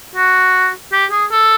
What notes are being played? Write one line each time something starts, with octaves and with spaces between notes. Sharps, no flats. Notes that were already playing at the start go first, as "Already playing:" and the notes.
F#4
G4
G#4
A4